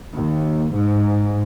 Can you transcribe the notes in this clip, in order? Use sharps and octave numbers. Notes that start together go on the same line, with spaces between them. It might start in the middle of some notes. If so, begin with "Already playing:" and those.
D#2
G#2